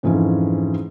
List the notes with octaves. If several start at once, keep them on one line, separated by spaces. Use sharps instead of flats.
F2 G#2 E3 F3 C#4